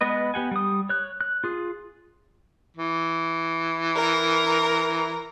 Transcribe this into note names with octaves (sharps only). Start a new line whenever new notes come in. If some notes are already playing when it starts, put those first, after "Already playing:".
G#3 B3 B4 D#5
B3 G4 F#5 G#5
G3 D#6
C#5 F#6
F#6
F4 G#4
E3
A#4 A#5